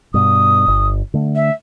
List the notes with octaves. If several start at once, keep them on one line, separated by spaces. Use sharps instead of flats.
G2 B2 D#6
G1
D3 A3
E5